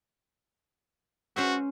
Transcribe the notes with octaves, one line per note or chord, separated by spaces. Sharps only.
C#4 F#4 C5 E5